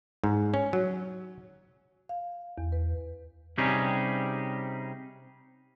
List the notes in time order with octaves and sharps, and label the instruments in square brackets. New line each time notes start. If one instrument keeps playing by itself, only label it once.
[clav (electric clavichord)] G#2
C#4
F#3
[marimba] F5
E2
B4
[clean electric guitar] C3 G3 C#4 D#4 G4 G#4